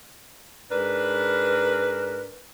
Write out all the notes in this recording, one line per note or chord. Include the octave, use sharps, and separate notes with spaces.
G#2 D4 A#4 B4